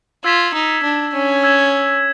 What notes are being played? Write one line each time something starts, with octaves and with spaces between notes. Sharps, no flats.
F4 E6 G#6 B6 E7
D#4
D4
C#4
E6 G#6 B6 E7